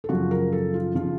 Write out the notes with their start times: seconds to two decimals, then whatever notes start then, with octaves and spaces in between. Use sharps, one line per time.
0.04 A4
0.09 F#2 C#3 F3 F#4
0.31 A#4
0.53 A4
0.74 F4
0.95 C#3 F3 F4